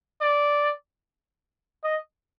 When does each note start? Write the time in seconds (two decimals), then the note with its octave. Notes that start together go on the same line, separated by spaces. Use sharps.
0.21 D5
1.84 D#5